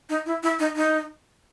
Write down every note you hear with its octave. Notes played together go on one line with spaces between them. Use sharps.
D#4
E4
E4
D#4
D#4